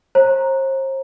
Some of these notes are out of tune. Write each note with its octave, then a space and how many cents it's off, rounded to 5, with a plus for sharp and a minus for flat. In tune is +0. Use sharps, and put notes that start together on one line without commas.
C5 +40 A#5 +0